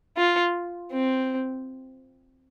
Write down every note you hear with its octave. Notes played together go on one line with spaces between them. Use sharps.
F4
C4